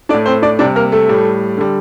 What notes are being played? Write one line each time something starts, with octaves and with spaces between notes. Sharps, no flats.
A2 A3 D4 D5
C4 C5
D4 D5
C3 G3 D4 D5
A#3 A#4
A3 A4
A2 G3
D3 G3